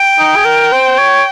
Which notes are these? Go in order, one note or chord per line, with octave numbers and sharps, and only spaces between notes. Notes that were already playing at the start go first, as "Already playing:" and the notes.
Already playing: G5
D#4
G#4
A#4
C5
C#5